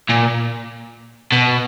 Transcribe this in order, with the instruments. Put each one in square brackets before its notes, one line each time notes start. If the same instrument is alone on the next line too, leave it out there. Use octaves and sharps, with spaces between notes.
[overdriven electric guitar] A#2
B2